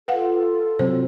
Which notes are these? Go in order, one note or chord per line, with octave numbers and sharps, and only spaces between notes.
F4 A4 B4 F5 F#5
C3 F#3 C4 C5